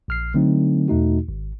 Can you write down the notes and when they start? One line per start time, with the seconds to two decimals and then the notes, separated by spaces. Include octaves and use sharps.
0.08 A#1 F6 C7
0.34 D3 F#3 A3 C4 D#4
0.88 E2 B2 A3 D#4 F#4
1.28 G#1